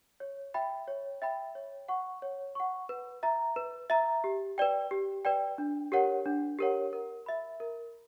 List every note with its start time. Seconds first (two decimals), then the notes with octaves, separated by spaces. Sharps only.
0.20 C#5
0.54 E5 G5 B5
0.88 C#5
1.22 E5 G5 B5
1.55 C#5
1.88 F#5 C#6
2.22 C#5
2.55 F#5 C#6
2.89 B4
3.23 E5 A#5
3.56 B4
3.90 E5 A#5
4.24 G4
4.58 B4 D5 G5
4.91 G4
5.25 B4 D5 G5
5.58 D4
5.92 G4 A#4 C#5 F#5
6.25 D4
6.59 G4 A#4 C#5 F#5
6.93 A#4
7.26 E5 B5
7.60 A#4